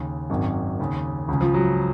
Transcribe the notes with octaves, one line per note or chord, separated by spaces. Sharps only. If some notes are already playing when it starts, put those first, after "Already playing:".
Already playing: D#2 C#3
G#1 F#2 D#3
D#2 C#3
C#2 C#3
F3
F#3